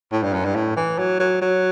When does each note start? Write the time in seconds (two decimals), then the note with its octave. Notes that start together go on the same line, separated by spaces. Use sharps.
0.12 A2
0.23 G2
0.34 F#2
0.45 G2
0.55 A2
0.77 E3
0.99 F#3
1.20 F#3
1.41 F#3